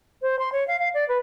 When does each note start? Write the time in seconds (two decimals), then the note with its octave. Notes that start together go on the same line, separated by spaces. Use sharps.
0.22 C5
0.39 C6
0.52 C#5
0.67 F5
0.79 F5
0.94 D5
1.08 B4